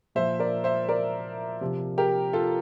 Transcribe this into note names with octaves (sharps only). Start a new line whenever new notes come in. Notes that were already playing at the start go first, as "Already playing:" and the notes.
A#2 F3 C5 E5
A#4 D5
C5 E5
A#4 D5
C3 F3
G4 A#4
F4 A4